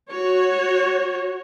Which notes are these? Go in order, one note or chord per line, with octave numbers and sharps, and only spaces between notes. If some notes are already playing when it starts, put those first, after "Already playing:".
F#4 C#5